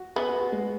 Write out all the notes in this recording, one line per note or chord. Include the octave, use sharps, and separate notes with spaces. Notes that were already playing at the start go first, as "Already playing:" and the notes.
Already playing: F#4
B3 G#4
F#4
F#4
G#3